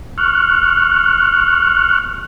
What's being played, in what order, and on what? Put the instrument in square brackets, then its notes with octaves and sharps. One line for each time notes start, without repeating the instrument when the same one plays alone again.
[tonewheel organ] C#6 F6 F#6